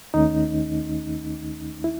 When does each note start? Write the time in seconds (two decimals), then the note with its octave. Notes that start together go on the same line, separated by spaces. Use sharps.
0.14 D#2 D#3 A3 C#4 D#4
1.84 E4